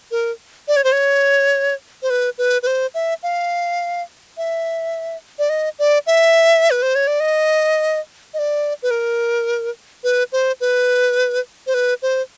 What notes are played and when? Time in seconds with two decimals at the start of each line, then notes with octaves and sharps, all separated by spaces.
0.11 A#4
0.68 D5
0.76 C#5
0.84 C5
0.92 C#5
2.03 C5
2.10 B4
2.38 B4
2.63 B4
2.67 C5
2.94 E5
3.23 F5
4.37 E5
5.39 D5
5.50 D#5
5.79 D5
6.07 E5
6.71 B4
6.82 C5
6.95 C#5
7.07 D5
7.20 D#5
8.34 D#5
8.39 D5
8.83 B4
8.91 A#4
10.04 B4
10.32 C5
10.60 B4
11.67 C5
11.74 B4
12.02 C5